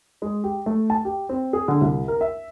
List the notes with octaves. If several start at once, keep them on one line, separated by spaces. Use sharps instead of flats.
G#3
G4
A3
A5
G4
C4
G#4
D3
C2
A#4
E5